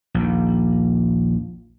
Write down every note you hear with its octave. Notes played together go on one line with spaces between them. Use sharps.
A#1 D#2